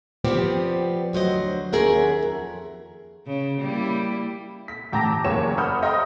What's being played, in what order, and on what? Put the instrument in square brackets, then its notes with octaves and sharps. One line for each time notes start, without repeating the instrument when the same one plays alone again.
[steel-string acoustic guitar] F3 B3 C4 G4 D5
D2 F#3 C5 D#5
D#2 C#4 G#4 A#4 E5 F#5
F2
[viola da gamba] C#3
G3 A#3 E4
[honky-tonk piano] B6
A1 G5 A5 A#5 D6 A#6
F#1 E2 A#3 C#5 E7
C5 F#5 B5 D#6 F6 G6
D#5 E5 G5 A#5 C6 D#6